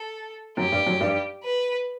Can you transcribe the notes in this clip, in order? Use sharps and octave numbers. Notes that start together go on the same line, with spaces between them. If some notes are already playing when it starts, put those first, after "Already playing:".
Already playing: A4
F#2 F#3 G4
G2 G3
F#2 F#3
G2 G3
B4